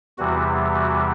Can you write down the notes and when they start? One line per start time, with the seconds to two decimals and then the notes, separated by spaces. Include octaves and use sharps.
0.18 E2 C3 E3 G3 F#4
0.75 F#4